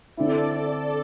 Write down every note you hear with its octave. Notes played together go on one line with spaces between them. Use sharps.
D3 C4 E4 A4 D5